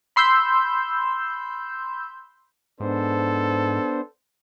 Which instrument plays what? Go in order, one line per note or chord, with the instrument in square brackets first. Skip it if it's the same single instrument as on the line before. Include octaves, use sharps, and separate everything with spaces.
[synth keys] B5 C6 E6 G6
[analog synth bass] G#2 [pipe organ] B3 D4 C5 [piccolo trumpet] A4